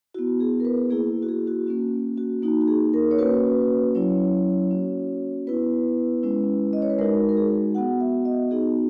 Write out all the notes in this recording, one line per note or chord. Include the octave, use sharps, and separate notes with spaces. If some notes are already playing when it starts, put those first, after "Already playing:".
B3 E4 F#4
G#4
A#4
B4
A#3 E4 G#4
F#4
G#4
F#4
A#3 C#4 F#4
F#4
A#3 D#4 F#4
F#4
G#4
A#4
C#5
A#3 C#4 F#4 B4
F#3 C#4 E4 C#5
A#3 C#4 F#4
B3 E4 B4
G#3 C#4 E4
D#5
C#5
B4
G#3 D#4 F#4 A#4
A#4
G#4
B3 F#4 F#5
E5
D#5
B3 D#4 F#4 G#4